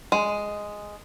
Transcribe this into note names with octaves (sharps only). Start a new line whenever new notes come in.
G#3